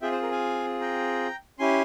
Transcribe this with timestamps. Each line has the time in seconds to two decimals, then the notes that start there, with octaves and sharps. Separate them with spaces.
0.02 C4 F4 G#4 E5 G5
0.12 C5
0.22 A#4
0.31 F5 G#5
0.81 G5 A#5
1.59 C#4 E4 G4 G#5 C6